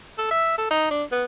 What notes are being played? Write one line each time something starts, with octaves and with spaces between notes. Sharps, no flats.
A4
E5
A4
D#4
D4
B3